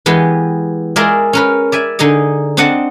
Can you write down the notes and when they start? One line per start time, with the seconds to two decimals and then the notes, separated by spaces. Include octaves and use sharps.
0.06 E3 G#3 B3 G4
0.96 G#3 F4 G#4 A#4 D5 E5
1.33 C#4 A#4 B4
1.72 D5 E5 G#5
1.99 D3 D#4 G#4 D#5
2.57 C4 D4 D#5 F#5 A5